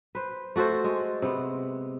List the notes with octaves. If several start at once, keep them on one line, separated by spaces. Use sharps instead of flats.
B4 C5
A3 F#4 A4 C5
G#3
C3 B3